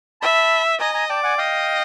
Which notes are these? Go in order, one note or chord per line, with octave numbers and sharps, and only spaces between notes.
E5 A5 B5
D#5 G#5 A#5
G#5 A#5
D5 G5 A5
F#5 G#5
D#5 F5 G5